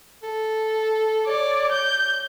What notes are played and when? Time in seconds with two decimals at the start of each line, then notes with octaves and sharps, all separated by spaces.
0.23 A4
1.27 C#5 D5
1.71 G6